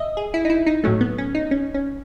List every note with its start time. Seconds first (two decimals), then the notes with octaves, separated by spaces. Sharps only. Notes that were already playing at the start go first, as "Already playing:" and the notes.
Already playing: D#5 E5
0.17 G#4
0.34 E4
0.45 D#4
0.50 E4
0.66 D#4
0.84 A2 F#3 A3 C#4
1.01 B3
1.18 C#4
1.35 D#4
1.51 C#4
1.74 C#4